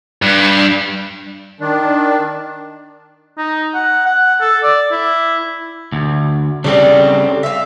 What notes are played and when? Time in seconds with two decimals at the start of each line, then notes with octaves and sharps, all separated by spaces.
0.22 G2
1.60 D#3 D4
3.38 D#4
3.74 F#5
4.05 F#5
4.41 A4
4.63 D5
4.92 E4
5.92 D2
6.64 C#3 G3 C4 D4 A4
7.43 E5 F5